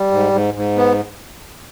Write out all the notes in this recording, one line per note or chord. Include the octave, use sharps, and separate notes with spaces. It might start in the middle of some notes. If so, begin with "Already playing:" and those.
Already playing: G3
G#2
G#2
G#2
B3